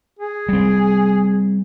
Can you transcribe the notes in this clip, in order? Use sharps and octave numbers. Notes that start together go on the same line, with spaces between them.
G#4
G3 C4